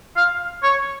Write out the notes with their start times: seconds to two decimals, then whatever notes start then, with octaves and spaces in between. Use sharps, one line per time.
0.17 F5
0.63 C#5